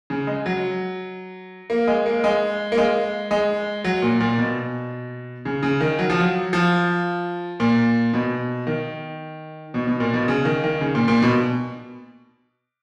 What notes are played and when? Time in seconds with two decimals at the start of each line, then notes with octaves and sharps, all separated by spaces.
0.10 C#3
0.27 G#3
0.46 F#3
1.70 A#3
1.87 G#3
2.06 A#3
2.24 G#3
2.72 A#3
2.77 G#3
3.31 G#3
3.84 F#3
4.02 A#2
4.20 A#2
4.38 B2
5.45 C#3
5.63 C#3
5.80 D#3
5.99 F#3
6.10 F3
6.20 F#3
6.53 F3
7.60 A#2
8.13 B2
8.67 D#3
9.74 B2
9.87 B2
10.00 A#2
10.14 B2
10.28 C#3
10.45 D#3
10.64 D#3
10.81 C#3
10.95 A#2
11.08 A#2
11.22 B2